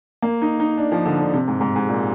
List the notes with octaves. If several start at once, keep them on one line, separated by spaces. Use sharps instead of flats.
A#3
D#4
D#4
D4
F3
D3
D3
C3
G#2
G#2
G#2
A#2